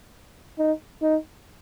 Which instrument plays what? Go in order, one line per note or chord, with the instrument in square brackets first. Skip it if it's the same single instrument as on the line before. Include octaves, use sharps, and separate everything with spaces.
[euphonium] D#4
D#4